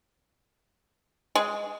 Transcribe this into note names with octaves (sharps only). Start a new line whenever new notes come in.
G#3